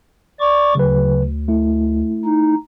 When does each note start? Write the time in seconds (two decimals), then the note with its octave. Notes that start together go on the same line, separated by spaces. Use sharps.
0.40 D5 C#6 D6
0.75 D2 C#3 F#3 B4
1.48 A3 E4
2.25 D#4